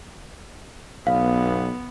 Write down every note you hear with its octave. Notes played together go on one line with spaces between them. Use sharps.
B1 B3 F5